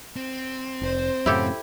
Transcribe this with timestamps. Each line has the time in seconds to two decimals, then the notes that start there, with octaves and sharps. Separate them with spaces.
0.16 C4
0.82 F1 C5
1.26 F#2 A2 C#3 E4 G4 A4